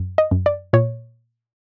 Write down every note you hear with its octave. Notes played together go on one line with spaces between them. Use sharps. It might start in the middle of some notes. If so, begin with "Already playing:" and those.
Already playing: F#2
D#5
F#2
D5
A#2 C#5